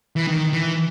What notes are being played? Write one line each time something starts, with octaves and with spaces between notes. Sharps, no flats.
E3
D#3
E3